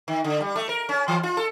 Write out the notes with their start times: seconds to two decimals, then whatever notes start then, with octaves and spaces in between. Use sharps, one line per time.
0.08 D#3
0.24 D3
0.41 G3
0.56 A3
0.69 A#4
0.89 C#4
1.08 E3
1.23 F4
1.37 A4